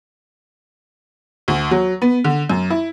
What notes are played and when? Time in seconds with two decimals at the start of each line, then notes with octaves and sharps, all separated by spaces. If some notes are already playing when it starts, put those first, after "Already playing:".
1.48 D2
1.71 F#3
2.02 B3
2.24 D3
2.50 F#2
2.70 E4